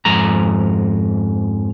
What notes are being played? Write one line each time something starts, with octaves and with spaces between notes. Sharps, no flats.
F2 G#2 A#5